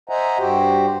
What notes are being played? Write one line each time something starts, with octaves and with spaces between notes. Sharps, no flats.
C5 D#5 E5 F#5 G#5 A#5
G2 F#4 G4 C5